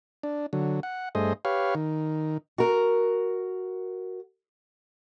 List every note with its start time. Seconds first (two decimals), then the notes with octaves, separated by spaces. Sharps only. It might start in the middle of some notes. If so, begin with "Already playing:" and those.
0.23 D4
0.53 D3 F#3
0.83 F#5
1.15 G2 A3 G#4 C5 D#5
1.45 G4 B4 C#5 F5
1.75 D#3
2.58 F#4 A#4